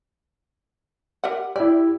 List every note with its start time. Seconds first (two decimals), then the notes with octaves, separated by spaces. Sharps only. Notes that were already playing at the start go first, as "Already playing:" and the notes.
1.24 G4 A#4 F#5
1.56 E4 G4 D5